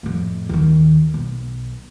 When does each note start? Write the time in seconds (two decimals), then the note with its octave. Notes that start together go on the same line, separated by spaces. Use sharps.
0.03 F2 A2
0.49 D#2 D#3
1.14 B1